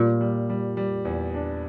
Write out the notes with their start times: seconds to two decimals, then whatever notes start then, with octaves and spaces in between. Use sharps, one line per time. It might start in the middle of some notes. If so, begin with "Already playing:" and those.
Already playing: A#2 G3
0.21 G3
0.50 G3
0.77 G3
1.05 E2
1.34 D4